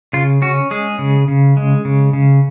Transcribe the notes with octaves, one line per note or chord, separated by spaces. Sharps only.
C#3 F4
C#4 F#4
G#3 G#4
C#3
C#3
G#3
C#3
C#3